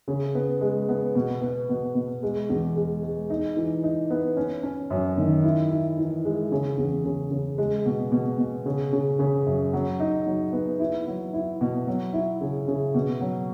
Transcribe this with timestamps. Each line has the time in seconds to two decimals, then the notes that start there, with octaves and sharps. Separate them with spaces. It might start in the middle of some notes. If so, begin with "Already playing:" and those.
0.08 C#3
0.35 B3
0.61 G#3
0.89 B3
1.15 B2
1.41 B3
1.69 B2
1.95 B2
2.23 G#3
2.49 E2
2.76 G#3
3.03 G#3
3.30 D#4
3.57 E3
3.83 D#4
4.10 B3
4.37 C#4
4.63 C#4
4.90 F#2
5.18 D#3
5.43 E4
5.70 E4
5.97 E3
6.25 G#3
6.52 C#3
6.77 E2
7.04 C#3
7.31 C#3
7.58 G#3
7.86 B2
8.12 B2
8.38 B2
8.66 C#3
8.93 C#3
9.19 C#3
9.46 F#2
9.73 F#3
10.00 D#4
10.26 F#3
10.53 B3
10.79 E4
11.07 F#3
11.33 E4
11.61 B2
11.87 F#3
12.13 E4
12.41 C#3
12.68 C#3
12.94 B2
13.21 F#3